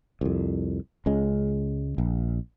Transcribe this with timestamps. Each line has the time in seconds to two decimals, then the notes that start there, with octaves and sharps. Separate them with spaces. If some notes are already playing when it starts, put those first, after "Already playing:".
0.21 C2 F2
1.06 C#2 C#3 G#3
1.98 A#1